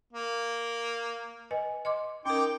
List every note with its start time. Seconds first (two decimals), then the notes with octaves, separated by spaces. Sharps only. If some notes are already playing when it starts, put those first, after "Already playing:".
0.13 A#3
1.51 B4 D#5 G#5
1.85 D#5 C6 D6
2.25 C#4 D#4 A#4 G5 D6